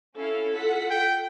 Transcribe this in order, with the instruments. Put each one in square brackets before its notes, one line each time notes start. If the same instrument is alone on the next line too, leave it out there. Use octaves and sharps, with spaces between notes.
[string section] C#4 E4 F5 [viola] A4
[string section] F4 F#5 B6
[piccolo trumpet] G5